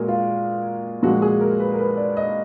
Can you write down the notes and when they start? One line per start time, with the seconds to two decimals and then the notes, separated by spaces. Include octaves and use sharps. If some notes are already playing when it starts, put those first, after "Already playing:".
Already playing: A#2 G#3 F#4 G#4 A#4
0.08 F4
1.03 A#2 F3 G#3 F#4
1.22 G#4
1.41 A#4
1.59 B4
1.74 A#4
1.78 B4
1.97 D5
2.17 D#5